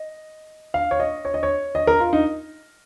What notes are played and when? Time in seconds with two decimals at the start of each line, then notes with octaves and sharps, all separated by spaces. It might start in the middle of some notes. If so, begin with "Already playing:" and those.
Already playing: D#5
0.74 F5
0.91 C#5
1.00 D#5
1.25 C#5
1.34 D#5
1.43 C#5
1.75 D#5
1.87 A#4
2.00 F4
2.13 D#4